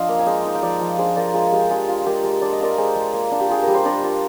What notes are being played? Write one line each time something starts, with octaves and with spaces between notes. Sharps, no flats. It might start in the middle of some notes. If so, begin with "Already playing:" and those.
Already playing: F3 D4 F4 D#5 F5
A#3
G#5
G#3 D#5 G5
D#4
G5
F3 D5 F5
F3
D4 G#4 C5
F4 A#4 D5
G#3 F4
G#3 G4
D4 F4 G#4
F4
G#3 G4 A#4
G#3
D4 D5
D#5
F4 A#4 D5
G#3 G#4 C5
G#3
A#3
D4
G4
F4 G#4
A#4
G3
C5
D4 A#4 D5
F4